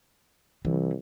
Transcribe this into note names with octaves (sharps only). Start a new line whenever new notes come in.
C2 E3